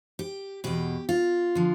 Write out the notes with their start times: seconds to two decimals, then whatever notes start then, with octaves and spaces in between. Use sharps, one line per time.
0.19 G4
0.64 E2 B2 G4
1.09 F4
1.55 D3 F3